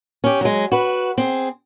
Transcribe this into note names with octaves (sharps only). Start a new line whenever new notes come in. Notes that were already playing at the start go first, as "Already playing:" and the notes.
C#4 G4
F#3 G#3
F#4 B4
C4 G#4